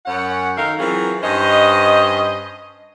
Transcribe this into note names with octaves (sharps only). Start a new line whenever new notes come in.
F#2 C#4 C#5 F#5
D#3 D#4 A4 A#4 F5
E3 F#3 C4 F4 G#4 A#4
G2 C#4 C5 D#5